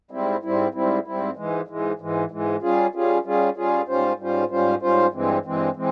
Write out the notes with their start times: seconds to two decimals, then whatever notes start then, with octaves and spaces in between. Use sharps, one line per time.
0.11 G#2 G3 C4 E4
0.43 G#2 G3 C4 E4
0.74 G#2 G3 C4 E4
1.05 G#2 G3 C4 E4
1.36 G#2 E3 G#3
1.67 G#2 E3 G#3
1.99 G#2 E3 G#3
2.31 G#2 E3 G#3
2.62 G3 C#4 F4 G#4
2.93 G3 C#4 F4 G#4
3.24 G3 C#4 F4 G#4
3.56 G3 C#4 F4 G#4
3.87 G#2 G3 C#4 F4 C5
4.19 G#2 G3 C#4 F4 C5
4.50 G#2 G3 C#4 F4 C5
4.82 G#2 G3 C#4 F4 C5
5.13 G2 E3 G#3 C4
5.45 G2 E3 G#3 C4
5.76 E3 G#3 C4